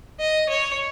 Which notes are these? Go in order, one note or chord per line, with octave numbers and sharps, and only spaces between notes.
D#5
C#5